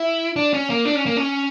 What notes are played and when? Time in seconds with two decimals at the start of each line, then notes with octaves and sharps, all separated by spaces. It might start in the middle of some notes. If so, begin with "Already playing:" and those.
Already playing: E4
0.36 D4
0.53 C#4
0.70 A#3
0.85 D4
0.95 C#4
1.06 A#3
1.17 C#4